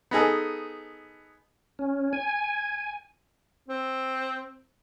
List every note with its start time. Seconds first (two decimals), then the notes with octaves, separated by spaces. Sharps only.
0.11 B3 D#4 G#4 A4
1.79 C#4
2.13 G#5
3.68 C4